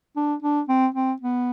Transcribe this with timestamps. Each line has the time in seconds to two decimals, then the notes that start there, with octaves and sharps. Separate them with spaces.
0.16 D4
0.43 D4
0.69 C4
0.94 C4
1.22 B3